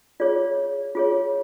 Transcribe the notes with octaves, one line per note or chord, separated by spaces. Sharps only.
F4 G#4 C#5 D5
F4 G#4 C#5